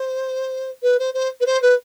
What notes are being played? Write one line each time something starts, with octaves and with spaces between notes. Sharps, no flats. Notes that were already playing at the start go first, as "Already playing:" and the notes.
Already playing: C5
B4
C5
C5
B4
C5
B4